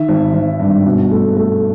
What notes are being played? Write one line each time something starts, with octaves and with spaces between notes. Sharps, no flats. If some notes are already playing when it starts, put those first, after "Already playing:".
Already playing: D#3 E5
G#1
G#1
G2
B2
A3
A3